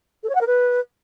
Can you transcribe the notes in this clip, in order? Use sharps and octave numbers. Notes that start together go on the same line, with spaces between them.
A4
C#5
F#5
A#4
B4